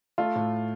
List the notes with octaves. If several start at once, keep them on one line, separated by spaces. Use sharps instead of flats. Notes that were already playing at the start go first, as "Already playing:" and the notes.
A3 F4
A2